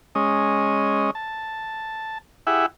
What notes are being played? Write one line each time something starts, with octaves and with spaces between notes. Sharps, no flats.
G#3 C#4 D#5
A5
E4 G4 G#4 E5 F#5